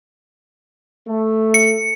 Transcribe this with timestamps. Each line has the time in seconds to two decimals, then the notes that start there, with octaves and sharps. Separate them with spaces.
1.07 A3
1.54 C#7